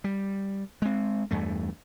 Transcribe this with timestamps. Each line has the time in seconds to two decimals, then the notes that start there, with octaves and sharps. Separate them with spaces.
0.04 G3
0.82 G#3 C4
1.31 E2 G2 A3